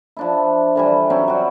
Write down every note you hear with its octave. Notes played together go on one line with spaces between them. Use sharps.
F3 D4 E4
D3 E3 G3
F#3 C4 C#4
G3 F#4